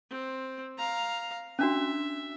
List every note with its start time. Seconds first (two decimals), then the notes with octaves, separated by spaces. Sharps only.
0.10 C4
0.78 F5 A#5
1.59 C#4 D4 F#4 E5